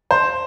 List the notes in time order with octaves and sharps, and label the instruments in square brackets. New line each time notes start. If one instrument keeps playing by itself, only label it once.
[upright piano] C5